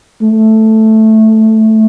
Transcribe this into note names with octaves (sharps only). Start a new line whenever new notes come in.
A3